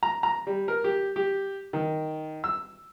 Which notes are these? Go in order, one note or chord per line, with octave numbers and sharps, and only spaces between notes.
A#5
A#5
G3
A#4
G4
G4
D#3
E6